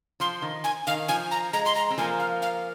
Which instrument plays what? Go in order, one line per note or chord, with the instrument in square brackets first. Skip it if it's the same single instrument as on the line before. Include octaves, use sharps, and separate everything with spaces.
[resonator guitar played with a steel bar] F3 [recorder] C6
[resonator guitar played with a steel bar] D#3
[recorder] G#5
[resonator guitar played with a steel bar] D#3 [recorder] F5
[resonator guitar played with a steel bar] F3 [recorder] G#5
[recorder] A#5
[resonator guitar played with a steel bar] G#3 [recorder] A#5
[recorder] C6
A#5
[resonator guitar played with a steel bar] C4
[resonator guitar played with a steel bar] F3 A#3 [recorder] G#5
[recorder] F5
F5